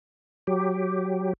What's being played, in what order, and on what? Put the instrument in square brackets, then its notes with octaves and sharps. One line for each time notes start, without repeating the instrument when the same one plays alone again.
[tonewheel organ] F#3 G4